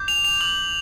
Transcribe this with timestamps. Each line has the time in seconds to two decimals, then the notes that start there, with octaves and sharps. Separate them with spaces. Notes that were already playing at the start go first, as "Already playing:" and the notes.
Already playing: D6 G6
0.08 F7
0.25 F7
0.41 D6 G6 F#7